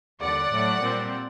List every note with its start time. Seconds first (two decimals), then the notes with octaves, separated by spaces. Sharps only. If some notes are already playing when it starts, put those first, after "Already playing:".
0.21 D#2 D3 G3 D5 F#5
0.51 A2 F#3 A3
0.81 A#2 G3 C4